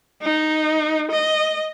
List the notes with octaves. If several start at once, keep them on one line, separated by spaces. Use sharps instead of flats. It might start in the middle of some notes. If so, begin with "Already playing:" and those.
D#4
D#5